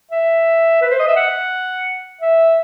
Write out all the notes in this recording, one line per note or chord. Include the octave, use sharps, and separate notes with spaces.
E5
B4
C5
D#5
E5
F#5
E5